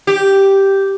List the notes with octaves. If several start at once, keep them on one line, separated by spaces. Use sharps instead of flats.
G4